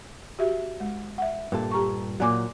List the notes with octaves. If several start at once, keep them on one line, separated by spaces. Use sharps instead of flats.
F#4 G4 E5
G#3
E5 F#5
G2 A#2 A4
G4 A#5 C#6
A#2 F#3 D5 G#5 D6